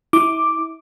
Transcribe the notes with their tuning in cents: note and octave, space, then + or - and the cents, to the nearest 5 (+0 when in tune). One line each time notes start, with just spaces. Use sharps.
E4 -30 D6 +0